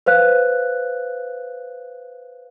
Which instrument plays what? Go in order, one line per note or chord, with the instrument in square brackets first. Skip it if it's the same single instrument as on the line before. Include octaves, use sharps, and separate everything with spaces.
[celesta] B4 C5 F5 F#6